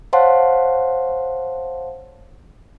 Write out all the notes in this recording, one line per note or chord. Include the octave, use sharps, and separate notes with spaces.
C5 C#5 F5 F#5 A5 C6